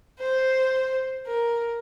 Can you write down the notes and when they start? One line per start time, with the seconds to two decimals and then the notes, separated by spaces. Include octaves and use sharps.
0.19 C5
1.26 A#4